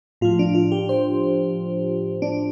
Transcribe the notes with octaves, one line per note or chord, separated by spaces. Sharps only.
A2 F3 F4
D4
F4
G4
C5
D4